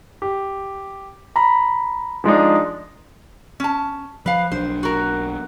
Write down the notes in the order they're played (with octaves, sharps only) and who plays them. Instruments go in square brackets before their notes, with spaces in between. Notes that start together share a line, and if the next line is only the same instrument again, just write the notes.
[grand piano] G4
A#5 B5
F3 G#3 D4 D#4
[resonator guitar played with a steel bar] C#4 A5
[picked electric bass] F3 [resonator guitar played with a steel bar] B4 F5
[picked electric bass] B1 F#3 D4 [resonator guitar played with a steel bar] C5
[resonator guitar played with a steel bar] F#4 A#4